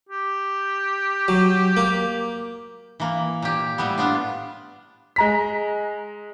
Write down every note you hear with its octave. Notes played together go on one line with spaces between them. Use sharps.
G4
F#3
A#3
E3 A#3
A#2 G4
A2 G3 B3
B3 D4 F4
G#3 A#5 B6